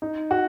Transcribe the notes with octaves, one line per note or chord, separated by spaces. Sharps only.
D#4
F#4